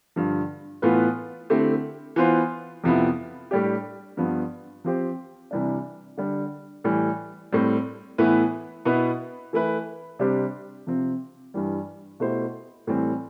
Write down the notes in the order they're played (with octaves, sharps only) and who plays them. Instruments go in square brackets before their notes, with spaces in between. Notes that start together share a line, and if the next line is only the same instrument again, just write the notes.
[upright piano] G2 D3 F3
A2 E3 B3 F4 B4
D3 A3 C4 E4 G4
E3 B3 F4 C5
F2 C3 F3 B3 E4
A2 G3 D4 G4
G2 F3 B3
F3 C4 G4 C5
C3 E3 G3 D4
D3 G3 D4
A2 E3 G3
A2 G3 C4
A2 E3 B3 E4 B4
B2 B3 E4 B4
E3 A3 E4 B4
C3 G3 D4 G4 C5
C3 F3 C4
G2 E3 G3
B2 A3 E4 G4 C5
A2 E3 G3 C4